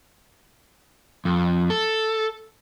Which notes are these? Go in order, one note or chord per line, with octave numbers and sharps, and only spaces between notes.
F2
A4